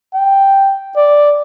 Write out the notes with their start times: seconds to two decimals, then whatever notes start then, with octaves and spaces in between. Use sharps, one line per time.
0.14 G5
0.96 D5